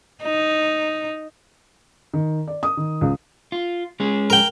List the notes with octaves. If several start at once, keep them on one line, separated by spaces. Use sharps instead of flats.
D#4
D#3
D5
D#6
D#3
C#2
F4
G#3 C#4 G#4
A#4 G5